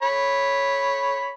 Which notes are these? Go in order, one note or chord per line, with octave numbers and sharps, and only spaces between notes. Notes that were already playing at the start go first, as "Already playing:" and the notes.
C#5 B5